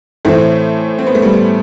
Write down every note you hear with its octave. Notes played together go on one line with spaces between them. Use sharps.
A2 E3 A3 C4
C4
B3
A3
G3 B3